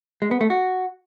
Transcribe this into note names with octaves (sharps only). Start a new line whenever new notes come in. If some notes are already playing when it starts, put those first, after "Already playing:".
G#3
B3
A3
F#4